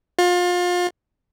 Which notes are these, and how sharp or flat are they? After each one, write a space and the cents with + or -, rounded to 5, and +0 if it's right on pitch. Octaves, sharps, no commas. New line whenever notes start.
F4 +30